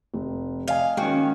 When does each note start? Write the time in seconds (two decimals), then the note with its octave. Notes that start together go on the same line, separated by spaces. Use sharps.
0.14 F1
0.68 D5 D#5 F5 G#5
0.97 D#3 G#3 A#3 C#4 F#4 G5